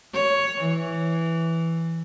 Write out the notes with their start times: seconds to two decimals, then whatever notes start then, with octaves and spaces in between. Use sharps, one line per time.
0.13 C#5
0.61 E3